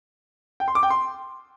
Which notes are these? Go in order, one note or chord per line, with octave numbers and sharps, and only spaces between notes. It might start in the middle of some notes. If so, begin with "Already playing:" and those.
G5
C6
D6
G5
C6